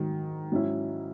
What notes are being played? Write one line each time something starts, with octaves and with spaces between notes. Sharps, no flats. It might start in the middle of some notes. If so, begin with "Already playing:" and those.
Already playing: G#2 D#3 F#3
G#2 F#3 C#4 E4